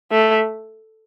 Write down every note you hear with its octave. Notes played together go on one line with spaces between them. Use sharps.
A3